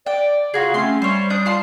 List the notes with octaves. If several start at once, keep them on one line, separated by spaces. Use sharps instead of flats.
D5 G5
C#3 F4 F#4 G#4
A3 C4 C#4 C6
G3 C5 C#5
D4 D#6 G6
F4 A5 C6